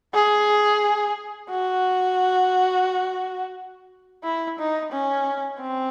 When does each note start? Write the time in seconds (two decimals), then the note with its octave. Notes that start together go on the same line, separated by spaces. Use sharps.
0.14 G#4
1.50 F#4
4.24 E4
4.59 D#4
4.92 C#4
5.61 C4